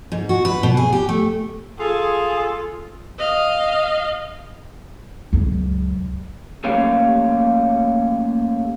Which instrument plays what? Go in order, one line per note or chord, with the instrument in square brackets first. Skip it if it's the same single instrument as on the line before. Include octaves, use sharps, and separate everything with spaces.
[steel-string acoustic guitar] G#2
F#4
B4
B2
G#4
G4
A3
[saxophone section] F4 A4 [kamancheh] G#4
[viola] D#5 F5
[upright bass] C#2 F#2
[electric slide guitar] A3 A#3 C#4 G4 C#5 F5